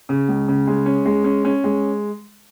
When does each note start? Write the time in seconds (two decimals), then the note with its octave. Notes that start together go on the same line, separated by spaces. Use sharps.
0.09 C#3
0.29 C#2
0.48 C#3
0.67 G#3
0.86 C#4
1.06 G#3
1.24 C#4
1.45 C#4
1.64 G#3